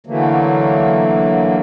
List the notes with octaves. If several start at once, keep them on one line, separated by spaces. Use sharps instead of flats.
D3 E3 F#3 A3 A#3